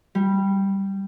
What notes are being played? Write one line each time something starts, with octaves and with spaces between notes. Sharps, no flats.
G3